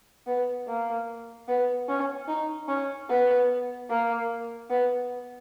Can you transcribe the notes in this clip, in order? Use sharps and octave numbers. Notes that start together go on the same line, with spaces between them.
B3
A#3
B3
C#4
D#4
C#4
B3
A#3
B3